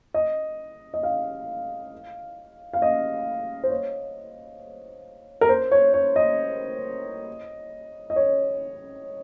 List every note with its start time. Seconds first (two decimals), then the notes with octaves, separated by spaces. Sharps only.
0.14 D#5
0.94 D#5
1.03 F5
2.73 F5
2.82 D#5
3.64 C5
3.70 C#5
5.41 A#4
5.49 C5
5.72 C#5
5.94 C#5
6.16 D#5
8.10 D#5
8.16 C#5